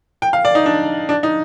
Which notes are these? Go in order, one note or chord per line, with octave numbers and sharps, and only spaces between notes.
G5
F5
D5
D#4
D4
D4
D#4